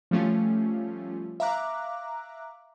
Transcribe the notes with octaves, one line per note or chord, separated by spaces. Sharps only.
F3 G3 A3 C#4 F4
E5 F5 A#5 D6 F#6